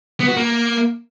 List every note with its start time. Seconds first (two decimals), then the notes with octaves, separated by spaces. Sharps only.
0.20 B3
0.28 F#4
0.37 A#3